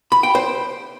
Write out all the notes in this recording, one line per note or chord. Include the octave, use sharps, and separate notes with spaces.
B5
G5
C5